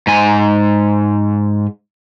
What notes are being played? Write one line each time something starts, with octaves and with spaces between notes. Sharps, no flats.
G#2 G#5